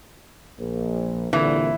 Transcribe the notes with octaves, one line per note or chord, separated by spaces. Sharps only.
A#1
C2 A#2 D3 E3